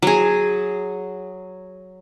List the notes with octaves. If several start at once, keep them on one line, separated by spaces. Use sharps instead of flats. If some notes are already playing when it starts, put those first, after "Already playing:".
F#3 G#4